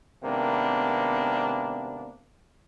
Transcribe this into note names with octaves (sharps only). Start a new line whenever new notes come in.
G#1 C3 A#3 B3 D4